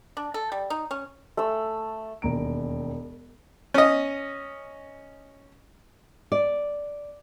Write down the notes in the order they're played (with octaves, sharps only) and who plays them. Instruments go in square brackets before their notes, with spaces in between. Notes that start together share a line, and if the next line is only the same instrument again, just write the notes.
[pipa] D4
A4
G3
D#4
C#4
[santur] A3 E6
[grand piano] E1 D#2 A#5 D7
[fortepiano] C#4 D#5
[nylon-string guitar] D5